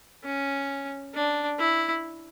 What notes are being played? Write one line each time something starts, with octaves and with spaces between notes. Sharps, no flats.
C#4
D4
E4